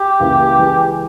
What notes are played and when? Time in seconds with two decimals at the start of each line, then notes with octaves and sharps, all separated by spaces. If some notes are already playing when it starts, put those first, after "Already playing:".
Already playing: G4
0.20 C#2 C#3 E3 A#3 E4
0.58 E3 G#3